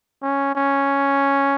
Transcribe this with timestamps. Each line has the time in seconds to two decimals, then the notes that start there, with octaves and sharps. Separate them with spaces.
0.22 C#4
0.55 C#4